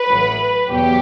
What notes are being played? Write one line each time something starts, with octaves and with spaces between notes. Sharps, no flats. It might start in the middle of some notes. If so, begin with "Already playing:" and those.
Already playing: B4
A1 A2 F#3
E2 B2 F#3 G4